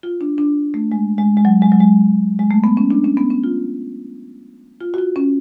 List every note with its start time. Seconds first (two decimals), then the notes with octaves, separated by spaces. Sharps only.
0.03 F4
0.21 D4
0.38 D4
0.74 A3
0.92 G#3
1.18 G#3
1.37 G#3
1.45 F#3
1.62 G#3
1.72 F#3
1.80 G#3
2.39 G#3
2.51 A3
2.64 B3
2.77 C#4
2.91 D4
3.04 C#4
3.17 B3
3.30 C#4
3.44 F4
4.81 F4
4.94 F#4
4.98 F4
5.16 C#4